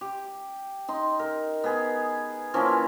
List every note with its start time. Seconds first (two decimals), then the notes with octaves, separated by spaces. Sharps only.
0.01 G4
0.88 D#4 C6
1.20 A#4
1.64 B3 G#4
2.54 E3 F3 A#3 C#4